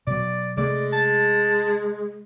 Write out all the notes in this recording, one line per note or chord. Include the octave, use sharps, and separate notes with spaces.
B2 F#3 D5
C3 G#3 A3 D5
A5